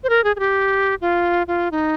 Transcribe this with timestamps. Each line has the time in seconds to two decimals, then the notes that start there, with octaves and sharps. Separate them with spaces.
0.04 C5
0.09 A#4
0.24 G#4
0.36 G#4
0.39 G4
1.01 F4
1.48 F4
1.72 D#4